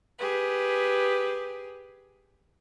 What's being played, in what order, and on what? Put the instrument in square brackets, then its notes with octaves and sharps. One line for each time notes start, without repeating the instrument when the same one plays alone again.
[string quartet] G4 G#4 B4